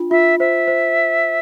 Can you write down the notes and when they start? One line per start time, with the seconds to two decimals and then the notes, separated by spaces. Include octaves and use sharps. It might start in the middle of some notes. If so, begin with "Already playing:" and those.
Already playing: D4 F4
0.11 F4 E5
0.39 C5 E5
0.68 C5